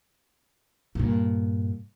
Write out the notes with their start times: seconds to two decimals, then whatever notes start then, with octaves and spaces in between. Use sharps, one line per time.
0.95 G2 A#2